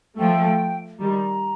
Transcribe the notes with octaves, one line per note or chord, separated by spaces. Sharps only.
F3 A3 G5
D#3 G3 A#5